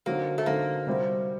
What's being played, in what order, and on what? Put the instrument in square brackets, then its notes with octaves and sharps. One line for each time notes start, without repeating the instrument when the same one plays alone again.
[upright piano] D3 F#3 C4 D#4 [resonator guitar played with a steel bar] A#3
[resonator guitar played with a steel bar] A3
[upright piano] D3 F#3 C4 D#4 [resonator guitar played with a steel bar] A#3
[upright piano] C3 G3 C4 F#4